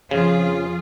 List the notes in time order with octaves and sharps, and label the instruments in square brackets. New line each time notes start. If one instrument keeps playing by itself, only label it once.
[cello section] F2 F4 G#4 [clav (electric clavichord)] C#3